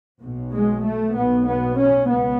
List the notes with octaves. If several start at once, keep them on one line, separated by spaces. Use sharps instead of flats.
B1 B2
G#3
A3
B1 B2 B3
B3
C#4
C#2 B3